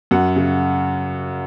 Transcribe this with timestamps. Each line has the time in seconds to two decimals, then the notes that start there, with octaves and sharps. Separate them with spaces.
0.11 F#2 F#5
0.36 C#3